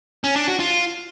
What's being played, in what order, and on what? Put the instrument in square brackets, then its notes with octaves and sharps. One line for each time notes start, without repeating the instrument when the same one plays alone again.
[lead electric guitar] C#4
D4
F#4
F4